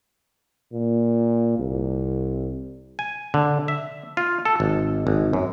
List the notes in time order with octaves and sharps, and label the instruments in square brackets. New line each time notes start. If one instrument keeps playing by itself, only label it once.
[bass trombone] A#2
C2
[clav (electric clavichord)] G#5
D3
E5
F4
A4
G#1
G#1
F#2